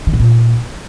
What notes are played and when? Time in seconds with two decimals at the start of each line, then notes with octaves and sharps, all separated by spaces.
0.07 D#3
0.13 A2
0.20 A#2